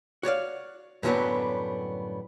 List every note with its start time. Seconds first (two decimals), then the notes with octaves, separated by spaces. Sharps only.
0.23 F#4 C#5 D5 F5
1.03 F#2 A2 D3 F#3 G3 B3